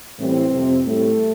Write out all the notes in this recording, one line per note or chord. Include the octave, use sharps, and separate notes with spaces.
A2 E3 G3 C4
F2 C3 F3
A2 G3 A3